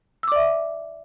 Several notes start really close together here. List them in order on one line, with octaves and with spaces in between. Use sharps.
E6 D6 D5 E5